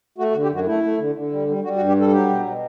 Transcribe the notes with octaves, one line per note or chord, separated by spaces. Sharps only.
A3 F#4
F#4
D3
G4
F#2 F#4
A3 E4
A3
D3
D3
G3
G3
G3 F#4
F#4
G2
G4
G3 A4
A4
F#3 G4
B2
B2